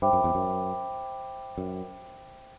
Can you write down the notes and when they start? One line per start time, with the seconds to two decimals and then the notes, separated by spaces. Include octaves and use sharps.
0.02 G2 C5 E5 G5 B5 D6
0.13 F#2
0.24 E2
0.35 F#2
1.58 F#2